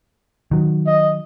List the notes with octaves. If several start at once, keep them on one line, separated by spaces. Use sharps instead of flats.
D#3 F#3
D#5